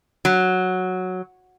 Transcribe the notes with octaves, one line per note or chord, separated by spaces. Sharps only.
F#3